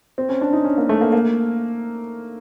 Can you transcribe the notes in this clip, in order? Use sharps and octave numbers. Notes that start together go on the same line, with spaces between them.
C4
C#4
D4
D#4
C#4
A#3
A3
A#3
A#3